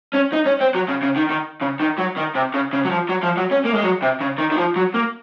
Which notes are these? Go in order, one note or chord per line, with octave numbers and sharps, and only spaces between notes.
C#4
D#4
C#4
C4
F#3
C#3
C#3
D#3
D#3
C#3
D#3
F#3
D#3
C3
C#3
C#3
F#3
F3
F#3
F3
F#3
C#4
A#3
G#3
F#3
C3
C#3
D#3
D#3
F3
F#3
A#3